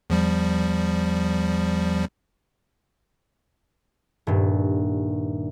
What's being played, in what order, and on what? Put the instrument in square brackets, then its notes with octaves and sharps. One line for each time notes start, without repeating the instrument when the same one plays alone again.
[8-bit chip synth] E2 F3 G3
[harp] D#1 G2